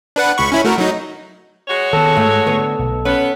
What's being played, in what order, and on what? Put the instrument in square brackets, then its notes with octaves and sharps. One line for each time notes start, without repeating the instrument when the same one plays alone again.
[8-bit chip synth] D4 B4 F#5
C#2 B5 C#6
C#4 E4 B5
A3 F#4 A#4
F#3 D#4
[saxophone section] G#3 F#4 C#5
[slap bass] D#3 B3 [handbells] A4 A5
[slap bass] G#2 [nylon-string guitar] A3
[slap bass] D3 [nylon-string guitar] B3
[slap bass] B1
[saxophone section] B3 B4 [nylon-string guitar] C#4